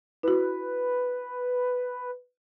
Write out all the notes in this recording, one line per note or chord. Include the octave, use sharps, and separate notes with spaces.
E4 F#4 B4